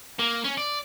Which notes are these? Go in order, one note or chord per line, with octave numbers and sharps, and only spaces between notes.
A#3
C#4
D5